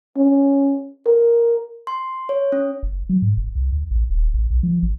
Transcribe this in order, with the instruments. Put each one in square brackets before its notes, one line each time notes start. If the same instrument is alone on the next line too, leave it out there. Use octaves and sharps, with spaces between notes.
[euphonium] C#4
A#4
[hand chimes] C6
C#5
C#4
[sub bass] F#1
F#3
G#2
F#1
C2
D2
A1
D#1
A1
B1
F3
G#1